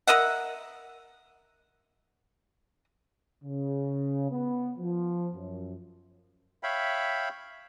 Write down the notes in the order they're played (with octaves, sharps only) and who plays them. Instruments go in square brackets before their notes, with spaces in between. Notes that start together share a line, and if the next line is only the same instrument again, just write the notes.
[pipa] A#4 D#5 E5 F#5
[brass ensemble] C#3
B3
F3
F#2
[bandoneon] C#5 E5 F5 G5 B5